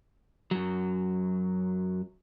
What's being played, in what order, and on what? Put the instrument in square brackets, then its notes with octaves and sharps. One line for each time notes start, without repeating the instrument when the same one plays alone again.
[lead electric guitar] F#2 F#3